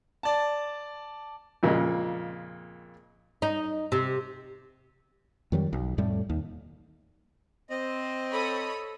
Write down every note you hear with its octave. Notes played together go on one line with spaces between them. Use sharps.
D5 A5
F2 A#2 C#3 G#3
D#4
C3
F2 D#3 F#3 G3
B1
F2 A2 G3 A3
D#2
C4 D#5
A4 C#5 B5 D#6